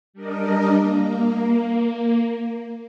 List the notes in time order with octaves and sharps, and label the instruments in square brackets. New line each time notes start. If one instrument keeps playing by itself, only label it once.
[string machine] G3 D4 A#4 D#5
A#3